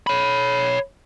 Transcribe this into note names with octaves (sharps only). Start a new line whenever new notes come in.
C#5 B5